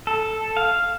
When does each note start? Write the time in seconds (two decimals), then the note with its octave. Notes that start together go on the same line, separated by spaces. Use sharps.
0.07 A4
0.57 F5